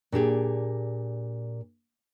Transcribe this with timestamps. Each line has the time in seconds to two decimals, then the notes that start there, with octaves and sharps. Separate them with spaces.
0.12 A#2 D4 G4 G#4